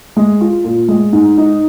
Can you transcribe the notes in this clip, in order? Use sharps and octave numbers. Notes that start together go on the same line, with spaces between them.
G#3
F4
A#2
G#3
G#2
D#4